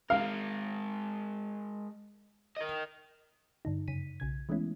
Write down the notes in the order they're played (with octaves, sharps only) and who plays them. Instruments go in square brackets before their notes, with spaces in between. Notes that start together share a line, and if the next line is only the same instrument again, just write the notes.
[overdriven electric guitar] G#3 A#4 [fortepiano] F5
[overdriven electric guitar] A#4 D#5
[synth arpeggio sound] G2 D3 D#4
F#2 C#3 B6 D#7
B1 C#3 G#6
E3 G#3 A3 B3 C#4 E4